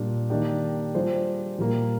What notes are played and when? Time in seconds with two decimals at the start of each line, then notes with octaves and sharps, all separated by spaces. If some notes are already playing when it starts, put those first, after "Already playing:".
Already playing: A#2 G3 D4
0.30 D#3 A#3 D4 G4
0.95 G3 D4 F4 G#4 C5
1.58 A#2 G3 A#3